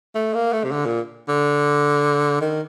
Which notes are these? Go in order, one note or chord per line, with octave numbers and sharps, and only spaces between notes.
A3
A#3
A3
C3
D3
A#2
D3
D#3